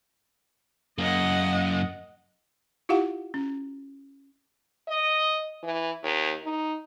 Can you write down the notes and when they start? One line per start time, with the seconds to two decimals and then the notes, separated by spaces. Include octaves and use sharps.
0.98 F#2 A#3 D#5 F#5
2.89 E4 F4 G4 F5 F#5
3.34 C#4
4.88 D#5
5.63 E3
6.03 D#2
6.44 D#4